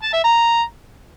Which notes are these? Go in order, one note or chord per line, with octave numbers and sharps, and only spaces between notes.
A5
E5
A#5